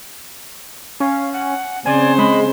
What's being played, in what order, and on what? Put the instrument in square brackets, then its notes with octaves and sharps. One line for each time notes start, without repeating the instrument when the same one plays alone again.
[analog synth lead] C#4 [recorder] F5
[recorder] F#5
[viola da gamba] C#3 C4 C5 [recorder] D5 [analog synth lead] G#5
[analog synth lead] G#3 [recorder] B5